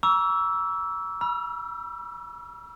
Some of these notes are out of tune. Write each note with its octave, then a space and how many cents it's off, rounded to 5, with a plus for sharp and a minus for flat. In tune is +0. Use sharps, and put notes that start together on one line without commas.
A#5 +35 C#6 +45 E6 +0
B5 -40 E6 +40